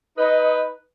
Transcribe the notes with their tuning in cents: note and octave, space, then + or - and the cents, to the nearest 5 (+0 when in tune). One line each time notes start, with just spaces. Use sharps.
D#4 +20 B4 +0 D#5 +0